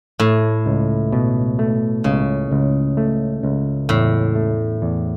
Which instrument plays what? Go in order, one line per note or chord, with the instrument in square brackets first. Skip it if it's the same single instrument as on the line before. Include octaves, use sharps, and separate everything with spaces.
[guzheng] A2 [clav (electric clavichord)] A3
[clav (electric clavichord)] C#2
B2
A3
[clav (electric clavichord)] C#2 [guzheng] C#3
[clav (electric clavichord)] C#2
A3
C#2
[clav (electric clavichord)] E2 [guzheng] A2
[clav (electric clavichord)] A3
E2